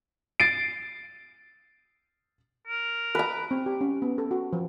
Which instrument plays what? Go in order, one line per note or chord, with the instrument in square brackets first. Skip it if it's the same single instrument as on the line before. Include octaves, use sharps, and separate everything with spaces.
[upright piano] A6 C7 D7
[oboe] A#4
[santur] B4 A#5
[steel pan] C4
G4
C#4
B3
A4
F#4
F3